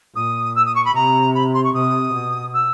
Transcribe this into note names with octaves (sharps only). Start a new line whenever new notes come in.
A#2 D#6
E6
D#6
C#6
B5
C3 A#5
B5
C6
C#6
C3 D#6
B2
E6